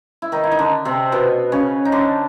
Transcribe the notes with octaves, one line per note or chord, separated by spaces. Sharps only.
E4
D#3 D#4
E4
D#4
D3 D4
C3 C4
B2 B3
C#3 C#4
D#4
D3 D4